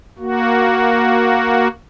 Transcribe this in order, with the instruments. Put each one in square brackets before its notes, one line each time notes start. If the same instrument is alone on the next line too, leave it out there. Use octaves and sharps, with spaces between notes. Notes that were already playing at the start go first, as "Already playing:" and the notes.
[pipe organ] A#3 F#4